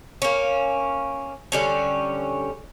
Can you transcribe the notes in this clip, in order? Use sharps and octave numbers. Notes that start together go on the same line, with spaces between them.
A#3 C#4
D3 G3 C#4